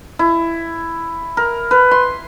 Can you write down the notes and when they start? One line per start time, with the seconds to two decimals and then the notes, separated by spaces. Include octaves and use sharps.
0.19 E4
1.37 A#4
1.71 B4
1.91 C6